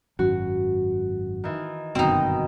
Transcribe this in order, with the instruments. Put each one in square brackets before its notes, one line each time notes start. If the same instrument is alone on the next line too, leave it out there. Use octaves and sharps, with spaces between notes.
[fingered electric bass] G#1 F#2 [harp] F#4
[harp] D#3 E3
[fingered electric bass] G1 F#2 [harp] B2 D#3 [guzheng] C4 D#4